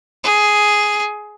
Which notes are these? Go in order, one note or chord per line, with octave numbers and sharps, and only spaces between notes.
G#4